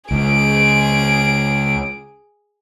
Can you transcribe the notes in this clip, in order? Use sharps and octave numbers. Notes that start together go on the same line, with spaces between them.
C#2 G#4 D7